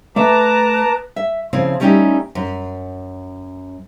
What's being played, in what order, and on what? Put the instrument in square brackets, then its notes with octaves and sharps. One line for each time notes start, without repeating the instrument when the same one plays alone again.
[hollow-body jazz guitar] A3 E5 [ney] B4 [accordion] A5 A#5 D6
[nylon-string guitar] E5
C#3 F3 C4 E4
G3 A3 C#4 D#4 E4 G4
F#2